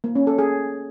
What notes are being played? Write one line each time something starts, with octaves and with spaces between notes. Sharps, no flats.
A#3
C#4
A4
G#4